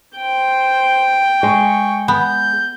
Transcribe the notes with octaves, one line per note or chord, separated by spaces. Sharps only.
C5 G5
G#3 C#6
B3 G6